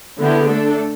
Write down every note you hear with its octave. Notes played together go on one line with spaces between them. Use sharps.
D3 B3 E4 G4
A3 D4 A4